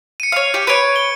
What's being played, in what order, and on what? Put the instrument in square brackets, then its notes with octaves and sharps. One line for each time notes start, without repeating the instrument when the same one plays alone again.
[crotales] C#7 D#7
[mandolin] C#5 F5
G4
[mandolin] B4 C#5 [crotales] C#7 D7
[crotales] G7